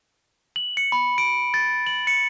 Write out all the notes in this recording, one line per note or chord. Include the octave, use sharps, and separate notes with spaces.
F#7
C#7
B5
D7
A6
F#7
C#7